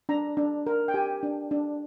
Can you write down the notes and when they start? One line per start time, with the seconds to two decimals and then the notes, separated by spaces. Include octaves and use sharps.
0.09 D4 A#5
0.37 D4
0.67 A#4
0.88 G5
0.94 G4 G#5
1.23 D4
1.51 D4